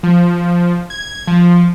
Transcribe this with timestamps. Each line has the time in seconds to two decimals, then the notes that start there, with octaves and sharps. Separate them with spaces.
0.03 F3
0.90 G#6
1.27 F3